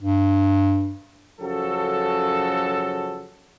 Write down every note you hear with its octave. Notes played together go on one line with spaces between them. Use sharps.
G2
F#2 C#3 F3 F#4 A4